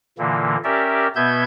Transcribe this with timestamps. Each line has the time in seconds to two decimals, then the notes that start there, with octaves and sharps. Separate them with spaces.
0.19 A#2 D3 E3 A#3
0.64 C#4 G4 A#4 D5 E5
1.16 B2 B3 E5 G6 G#6